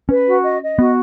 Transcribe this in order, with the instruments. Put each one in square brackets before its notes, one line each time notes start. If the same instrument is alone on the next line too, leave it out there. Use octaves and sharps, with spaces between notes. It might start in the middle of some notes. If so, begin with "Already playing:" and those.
[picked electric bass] C#4 [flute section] B4
[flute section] F#4
D#5
D#5
[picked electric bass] B3 [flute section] F#4